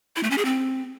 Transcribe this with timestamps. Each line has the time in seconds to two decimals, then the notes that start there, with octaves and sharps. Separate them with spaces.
0.16 E4
0.23 A3
0.31 C#4
0.38 G#4
0.45 C4